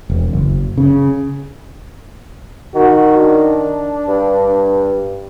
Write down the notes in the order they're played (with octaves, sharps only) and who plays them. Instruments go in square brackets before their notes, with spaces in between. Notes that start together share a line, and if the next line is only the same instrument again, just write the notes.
[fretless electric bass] E1
F#1
C#3
[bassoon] D#3 [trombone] F#4
[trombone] D4
[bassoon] G2